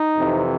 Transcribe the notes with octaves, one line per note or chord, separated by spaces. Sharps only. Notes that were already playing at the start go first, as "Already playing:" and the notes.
Already playing: D#4
F2 C3 E3